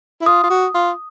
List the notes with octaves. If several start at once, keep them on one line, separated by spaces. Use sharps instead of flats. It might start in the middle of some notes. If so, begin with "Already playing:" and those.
E4
F4 D#6
F4
F#4
F4